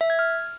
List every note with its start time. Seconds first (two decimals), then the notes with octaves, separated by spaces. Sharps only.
0.01 E5
0.10 G#6
0.19 F6